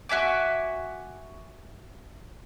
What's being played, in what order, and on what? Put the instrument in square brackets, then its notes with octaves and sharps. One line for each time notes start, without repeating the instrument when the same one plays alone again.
[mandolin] F#4 E5 G#5 D6